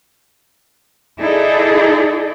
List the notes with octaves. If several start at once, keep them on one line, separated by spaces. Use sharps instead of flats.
D#4 E4 G#4 A4 D5